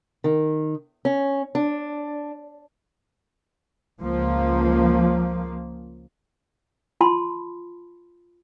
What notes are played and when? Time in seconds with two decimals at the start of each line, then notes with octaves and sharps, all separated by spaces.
0.24 D#3
1.05 C#4
1.55 D4
4.01 C#2 F3 A#3
7.01 F4 A5 B5 C6